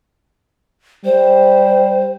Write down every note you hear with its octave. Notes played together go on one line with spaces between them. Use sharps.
G3 C5